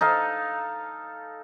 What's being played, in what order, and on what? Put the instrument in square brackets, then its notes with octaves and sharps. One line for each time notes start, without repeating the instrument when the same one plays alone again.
[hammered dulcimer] D#4 A4 F5